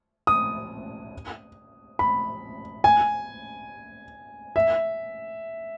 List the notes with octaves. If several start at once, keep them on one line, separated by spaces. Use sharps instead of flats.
D#6
B5
G#5
E5